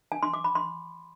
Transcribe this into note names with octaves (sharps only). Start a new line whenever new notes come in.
G#5
C6
D6
B5
C6